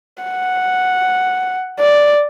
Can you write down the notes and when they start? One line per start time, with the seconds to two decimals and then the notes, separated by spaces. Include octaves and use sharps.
0.23 F#5
1.80 D5